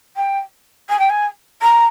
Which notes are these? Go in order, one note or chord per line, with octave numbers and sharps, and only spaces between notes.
G5
G#5
G5
G#5
A#5